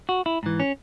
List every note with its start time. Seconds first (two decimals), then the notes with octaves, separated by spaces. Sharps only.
0.09 F#4
0.26 E4
0.43 G#2 E3
0.60 C#4